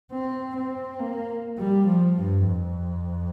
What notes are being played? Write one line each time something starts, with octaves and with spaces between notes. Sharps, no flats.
C4
C4
A#3
G3
F3
G2
F2